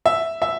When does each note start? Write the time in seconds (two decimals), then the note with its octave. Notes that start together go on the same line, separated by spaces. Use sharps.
0.06 E5
0.42 E5